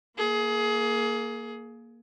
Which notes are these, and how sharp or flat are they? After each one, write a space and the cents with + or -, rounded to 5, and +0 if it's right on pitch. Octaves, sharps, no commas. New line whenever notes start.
A#3 +0 G#4 +25